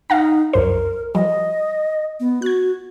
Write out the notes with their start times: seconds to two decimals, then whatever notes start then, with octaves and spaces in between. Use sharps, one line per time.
0.10 D#4 F5 F#5 A#5
0.53 C2 F#2 A#4 C5
1.15 F3 G3 D#5
2.20 B3
2.42 F#4 F#6 G#6